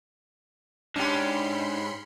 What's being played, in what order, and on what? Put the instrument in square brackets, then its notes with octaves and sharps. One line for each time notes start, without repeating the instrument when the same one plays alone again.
[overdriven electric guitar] G#2 [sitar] C#4 G4 [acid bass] D4 [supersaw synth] B5 C6 C#7